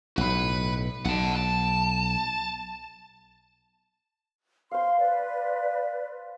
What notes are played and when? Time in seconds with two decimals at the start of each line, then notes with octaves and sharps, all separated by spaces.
0.18 B1 A2 B4 B5
1.05 B1 F#5 A5
1.36 A5
4.71 C5 F5 C6
4.99 B4 D5